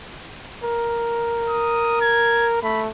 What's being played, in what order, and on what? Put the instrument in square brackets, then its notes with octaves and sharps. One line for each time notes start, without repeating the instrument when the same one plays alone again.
[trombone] A#4
[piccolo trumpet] D#6
G#6
[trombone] A3 [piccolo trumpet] B5